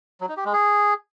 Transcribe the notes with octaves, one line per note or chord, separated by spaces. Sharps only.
F#3
D#4
G4
G#3
G#4